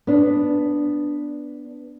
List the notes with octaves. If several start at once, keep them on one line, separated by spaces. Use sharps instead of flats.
B3 D4